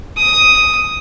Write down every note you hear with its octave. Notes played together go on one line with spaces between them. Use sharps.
D#6